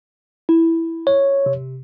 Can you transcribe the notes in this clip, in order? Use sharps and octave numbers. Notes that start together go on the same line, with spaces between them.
E4
C#5
C3